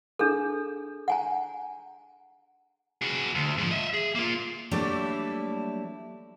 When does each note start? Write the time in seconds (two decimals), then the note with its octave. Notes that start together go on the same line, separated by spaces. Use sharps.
0.19 D4 G#4 A4
1.08 F#5 G#5 A#5
3.02 F#4 G#4
3.35 D2
3.58 G#2 F3
3.71 D#5 E5
3.94 G#4
4.15 A#3 F4
4.71 F#3 G3 A3 A#3 D4 E4